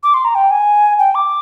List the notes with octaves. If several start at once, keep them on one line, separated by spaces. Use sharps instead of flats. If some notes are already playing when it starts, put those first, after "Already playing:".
D6
C6
A#5
G5
G#5
G5
D6